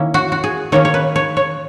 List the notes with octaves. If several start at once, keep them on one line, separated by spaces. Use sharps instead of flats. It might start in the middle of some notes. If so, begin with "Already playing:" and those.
Already playing: D#3 A#3 C#4 E4
F#4
F#4
G#4
D#3 A#3 C#4 C#5
C#5
B4
C#5
C#5